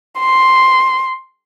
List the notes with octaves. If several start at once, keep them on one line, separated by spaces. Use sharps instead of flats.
C6